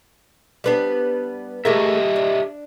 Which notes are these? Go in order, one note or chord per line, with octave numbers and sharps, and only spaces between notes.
G3 B3 D4
A3 G4 G#4 A#4 D#5 E5
D4